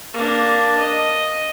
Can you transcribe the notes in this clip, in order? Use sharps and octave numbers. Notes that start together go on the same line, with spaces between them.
A#3 D4
D#5